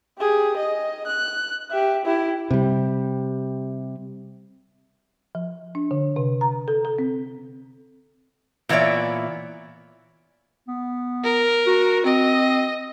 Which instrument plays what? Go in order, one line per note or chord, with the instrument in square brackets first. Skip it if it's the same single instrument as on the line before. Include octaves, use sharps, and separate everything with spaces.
[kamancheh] G4 G#4
D#5
F#6
G4 E5
E4 G4
[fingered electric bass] C3 G3
[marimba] F3
D4
D3
C3
A#5
A4
A4
C4
[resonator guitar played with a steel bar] A#2 E3 B3 C#5 D5 E5
[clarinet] B3
[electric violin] A#4
[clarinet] F#4
[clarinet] C4 [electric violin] D#5